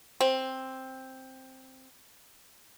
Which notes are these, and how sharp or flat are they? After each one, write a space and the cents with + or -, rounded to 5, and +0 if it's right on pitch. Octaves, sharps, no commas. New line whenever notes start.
C4 +5